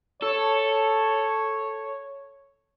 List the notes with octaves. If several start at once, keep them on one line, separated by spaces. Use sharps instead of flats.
A4 C#5